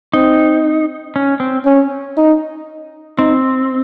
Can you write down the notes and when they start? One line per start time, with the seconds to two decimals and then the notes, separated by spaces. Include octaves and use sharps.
0.13 C4 D#4
1.16 C#4
1.40 C4
1.66 C#4
2.17 D#4
3.18 C4 D#4